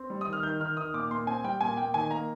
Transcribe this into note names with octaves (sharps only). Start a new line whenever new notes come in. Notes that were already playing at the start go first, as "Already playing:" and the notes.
Already playing: C4
G3
D#6
D#3
F6
D#3 G6
D#3 F6
D#3 D#6
A#2 D6
A#2 C6
C4 G#5
G3 G5
A#2 G#5
A#2 G5
D#3 G#5
A#3 A#5